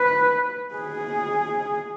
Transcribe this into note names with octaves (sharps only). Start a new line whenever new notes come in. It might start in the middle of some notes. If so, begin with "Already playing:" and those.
Already playing: B4
G#4